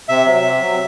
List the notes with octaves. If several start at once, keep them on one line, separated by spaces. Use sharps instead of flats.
C3 E5
F#3
C3
F#3